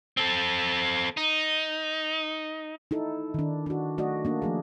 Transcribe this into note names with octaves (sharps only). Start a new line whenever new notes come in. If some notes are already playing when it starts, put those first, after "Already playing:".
C4 A4
D#4
D#4 E4 A4
D#3 D4
D4 F#4
A3 F#4 D5 D#5
A#3 D4
F3 A3 G#4